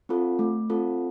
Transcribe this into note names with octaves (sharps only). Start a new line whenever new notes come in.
C4 F4 A4
A3
C4 F4 A4